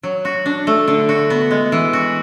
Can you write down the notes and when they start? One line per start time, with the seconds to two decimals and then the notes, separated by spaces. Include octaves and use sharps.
0.03 F#3
0.25 F#4
0.45 D4
0.67 A3
0.88 D3
1.09 F#4
1.30 B3
1.51 G#3
1.72 E3
1.93 F#4